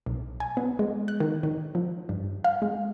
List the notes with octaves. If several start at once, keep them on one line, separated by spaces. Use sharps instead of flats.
B1
G#5
B3
G#3
F#6
D#3
D#3
F3
G2
F5
G#3